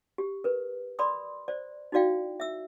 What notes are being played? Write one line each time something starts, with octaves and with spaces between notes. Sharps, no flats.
G4
A#4 B4
D5 B5 C6 D#6
C5 D5
D#4 E4 F#4 D5 F5 G5
E5 E6